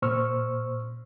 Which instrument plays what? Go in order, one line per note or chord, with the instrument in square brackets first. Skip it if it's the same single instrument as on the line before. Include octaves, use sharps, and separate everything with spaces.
[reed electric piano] A#2 C5 C#6 E6 F6